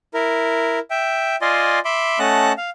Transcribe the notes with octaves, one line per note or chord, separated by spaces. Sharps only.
E4 A#4
E5 G5
F4 D5 D#5 G#5 C6
E5 B5 C6 D6
A3 C#4 D#5 F#5 A5 F#6
F5